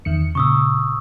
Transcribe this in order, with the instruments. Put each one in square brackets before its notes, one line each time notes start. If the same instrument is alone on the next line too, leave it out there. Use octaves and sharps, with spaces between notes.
[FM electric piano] E2 D#3 C#7
[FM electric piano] A#2 C#3 [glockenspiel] C#6 D#6 E6